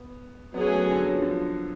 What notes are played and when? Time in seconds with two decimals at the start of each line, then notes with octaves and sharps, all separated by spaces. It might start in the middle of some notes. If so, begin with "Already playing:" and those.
Already playing: B3
0.54 F#3 B3 C#4 G#4
0.67 A3
0.79 B3
0.91 D3
1.04 F#3
1.13 F3
1.22 D3
1.31 F3